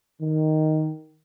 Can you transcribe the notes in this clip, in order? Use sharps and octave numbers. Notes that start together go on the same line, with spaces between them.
D#3